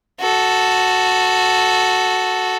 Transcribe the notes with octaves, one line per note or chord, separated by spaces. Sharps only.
F#4 A4